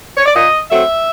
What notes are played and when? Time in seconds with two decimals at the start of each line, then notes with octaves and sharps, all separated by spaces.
0.17 C#5
0.26 D5
0.35 A#2 D#5
0.70 F#3 A3 C4 E5